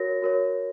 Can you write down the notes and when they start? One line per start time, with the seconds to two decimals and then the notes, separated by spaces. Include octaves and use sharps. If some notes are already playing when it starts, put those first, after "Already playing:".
Already playing: F#4 A#4 C#5 A#6
0.22 F#4 A#4 C#5